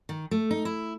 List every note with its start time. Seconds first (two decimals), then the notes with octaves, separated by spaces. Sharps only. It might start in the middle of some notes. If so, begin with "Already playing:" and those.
0.09 D#3
0.31 A3
0.51 D#4
0.65 E4